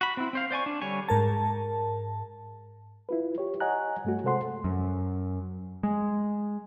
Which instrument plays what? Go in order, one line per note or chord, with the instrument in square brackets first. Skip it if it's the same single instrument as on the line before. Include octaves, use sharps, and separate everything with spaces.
[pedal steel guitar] F#4 B5
C4 E4
C4 C5 F5
C5 D5 G#5 C#6
D4
D3 G3 C#5 G#5
[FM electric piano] G#2 A#4 A5
[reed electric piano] E4 F4 B4
G4 C#5
C#5 D#5 F#5 G#5 A#5 F#6
G2 A3 F#4
C3 G#3 A4 C5 F#5 C6
[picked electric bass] F#2
G#3